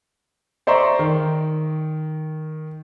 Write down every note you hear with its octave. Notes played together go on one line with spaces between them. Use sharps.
C5 D5 E5 A#5 C6 C#6
D#3